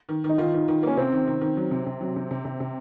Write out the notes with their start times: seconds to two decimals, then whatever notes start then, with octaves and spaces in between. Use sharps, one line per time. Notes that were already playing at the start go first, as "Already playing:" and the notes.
0.09 D#3
0.24 D#3
0.29 D#4
0.38 D#3 F4
0.54 D#3
0.68 D#3
0.83 A#3 C#4
0.97 C3 C4
1.12 D#3
1.27 D#3
1.41 D#3
1.57 F#3
1.71 C3
1.86 C3
2.01 F#3
2.16 C3
2.31 C3
2.45 C3
2.60 C3